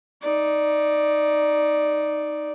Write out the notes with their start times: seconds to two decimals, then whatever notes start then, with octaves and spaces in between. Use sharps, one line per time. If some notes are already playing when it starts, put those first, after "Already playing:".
0.21 D#4 D5